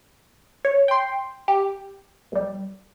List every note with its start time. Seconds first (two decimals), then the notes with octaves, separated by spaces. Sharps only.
0.65 C#5
0.88 G5 C6
1.48 G4
2.32 B1 G3